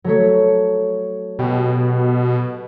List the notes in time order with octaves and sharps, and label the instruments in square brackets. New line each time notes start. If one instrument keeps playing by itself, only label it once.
[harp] F#3 A3 C#5
[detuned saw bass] B2 [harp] G4